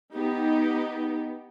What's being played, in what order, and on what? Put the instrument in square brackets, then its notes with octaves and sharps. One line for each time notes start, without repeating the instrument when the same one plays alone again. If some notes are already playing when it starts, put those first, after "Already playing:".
[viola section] B3 D#4 G4